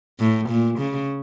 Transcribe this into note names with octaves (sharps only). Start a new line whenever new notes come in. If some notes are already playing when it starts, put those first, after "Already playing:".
A2
A#2
C#3